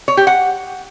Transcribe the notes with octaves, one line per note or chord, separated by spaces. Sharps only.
C#5
G4
F#5